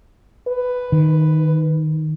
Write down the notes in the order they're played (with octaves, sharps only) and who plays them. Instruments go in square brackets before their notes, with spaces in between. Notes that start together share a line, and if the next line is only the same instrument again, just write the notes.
[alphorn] B4
[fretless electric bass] D#3